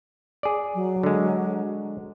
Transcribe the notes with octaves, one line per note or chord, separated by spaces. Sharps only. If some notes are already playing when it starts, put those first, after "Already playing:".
G#4 D5
F#3
D3 G#3